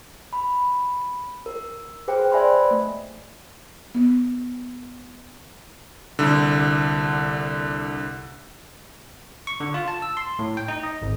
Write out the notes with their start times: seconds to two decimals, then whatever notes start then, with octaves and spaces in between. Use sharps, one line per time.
0.33 B5
1.46 A#4
2.08 G#4 B4 C5 G5
2.32 C5 D5 E5 G#5 B5 C6
2.71 A3
3.95 B3
6.19 C2 D3
9.47 C#6
9.60 D3
9.74 F4
9.88 A5
10.02 E6
10.17 C6
10.39 A2
10.57 G5
10.68 D#4
10.83 D#5
11.02 G#1